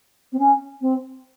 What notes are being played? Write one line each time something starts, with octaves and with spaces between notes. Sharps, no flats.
C4
C#4
C4